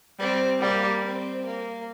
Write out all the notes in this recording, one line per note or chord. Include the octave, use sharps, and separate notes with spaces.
G3 C4
G3 A#3
C4
A#3